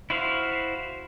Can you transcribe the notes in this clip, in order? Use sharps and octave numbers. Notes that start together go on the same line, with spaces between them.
E4 F#4 C5 F5